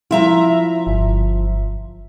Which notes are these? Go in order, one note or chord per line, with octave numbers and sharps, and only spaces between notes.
F3 E4 E5 A#5
G1